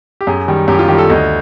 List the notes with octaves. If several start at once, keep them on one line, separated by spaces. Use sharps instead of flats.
G4
F#2 G#4
D#3 G3
F#2 G4
F4
D#3 G3 G4
A4
D2 D#5